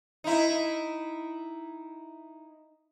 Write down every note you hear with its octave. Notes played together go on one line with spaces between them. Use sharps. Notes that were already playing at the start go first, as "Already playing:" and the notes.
D#4 E4